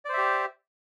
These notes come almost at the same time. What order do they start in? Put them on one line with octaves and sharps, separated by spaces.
D5 C5 E5 G4